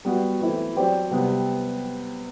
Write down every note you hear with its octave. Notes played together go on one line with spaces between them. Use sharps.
G3 B3 F#4
E3 A3 C4 E4
F#3 C4 G4 D5
C3 G3 B3